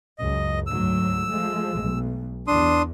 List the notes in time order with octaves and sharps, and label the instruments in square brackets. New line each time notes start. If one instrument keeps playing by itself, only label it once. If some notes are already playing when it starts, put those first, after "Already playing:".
[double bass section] C#2 F#2 [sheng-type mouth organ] D#5
[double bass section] D2 G#2 F#3 [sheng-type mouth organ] E6
[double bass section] F3 G#3 A3
B1
[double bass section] E2 [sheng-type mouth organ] D4 C6 D#6